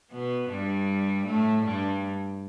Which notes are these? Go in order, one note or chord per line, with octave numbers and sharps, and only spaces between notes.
B2 B3
G2 G3
A2 A3
G2 G3